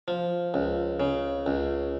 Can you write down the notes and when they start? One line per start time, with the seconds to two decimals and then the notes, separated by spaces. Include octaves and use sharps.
0.08 F3
0.54 C#2
1.00 C#3
1.46 C#2